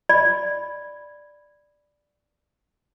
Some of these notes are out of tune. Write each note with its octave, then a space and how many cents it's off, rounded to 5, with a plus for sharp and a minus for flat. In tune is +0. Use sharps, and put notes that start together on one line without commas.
D5 +5 B5 +0